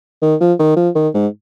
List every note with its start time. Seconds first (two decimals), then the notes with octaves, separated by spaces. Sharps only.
0.22 D#3
0.40 F3
0.59 D#3
0.76 F3
0.95 D#3
1.14 G#2